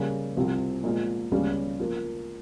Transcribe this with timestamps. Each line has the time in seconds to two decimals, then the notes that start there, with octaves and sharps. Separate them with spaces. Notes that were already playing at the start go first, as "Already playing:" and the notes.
Already playing: C#3 G3 A#3
0.37 C2 C3 F3 C4 F4
0.84 A#2 F3 G#3
1.32 C#2 C#3 G3 C#4
1.80 F3 A#3 F4